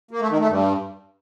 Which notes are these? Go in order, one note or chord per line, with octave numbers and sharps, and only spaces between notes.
A#3
A3
D#3
A3
G2